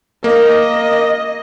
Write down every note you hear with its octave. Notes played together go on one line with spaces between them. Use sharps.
A#3 D#5